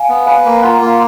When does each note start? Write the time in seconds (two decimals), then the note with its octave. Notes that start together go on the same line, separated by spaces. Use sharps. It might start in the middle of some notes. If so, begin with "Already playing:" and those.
Already playing: F5 G#5
0.09 B3
0.26 B4 F5 G#5
0.45 A#3
0.63 F4 F#5 A#5
0.82 A#3 A#5